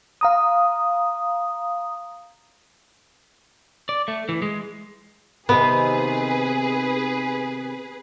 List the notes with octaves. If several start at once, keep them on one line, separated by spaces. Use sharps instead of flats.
F5 A#5 D#6
D5
A3
E3
G#3
C3 D#3 B3 G#4 B4